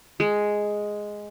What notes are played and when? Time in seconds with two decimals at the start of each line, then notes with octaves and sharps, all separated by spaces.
0.20 G#3